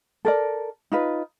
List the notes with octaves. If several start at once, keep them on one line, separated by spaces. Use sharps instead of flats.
A4 A#4 D5
D#4 F4 B4